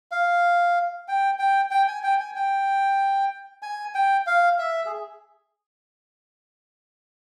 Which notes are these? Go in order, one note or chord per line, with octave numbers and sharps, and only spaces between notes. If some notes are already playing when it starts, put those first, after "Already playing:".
F5
G5
G5
G5
G#5
G5
G#5
G5
G#5
G5
F5
E5
G#4